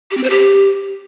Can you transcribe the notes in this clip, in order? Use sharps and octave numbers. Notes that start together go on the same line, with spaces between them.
G4
C4
C5
G4